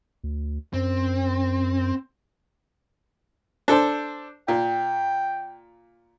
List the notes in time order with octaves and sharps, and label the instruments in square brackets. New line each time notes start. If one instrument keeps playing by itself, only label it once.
[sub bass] D2
[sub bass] F#2 [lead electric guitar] C4
[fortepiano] D4 A4 C5
[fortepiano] A#2 [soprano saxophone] G5